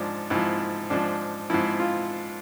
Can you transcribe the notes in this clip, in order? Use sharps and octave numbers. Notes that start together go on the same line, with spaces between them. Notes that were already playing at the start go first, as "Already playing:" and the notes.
Already playing: G#2 F3 D4
G#2 F3 E4
G#2 F3 D4
G#2 F3 E4
F4